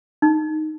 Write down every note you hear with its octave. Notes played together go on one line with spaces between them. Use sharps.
D#4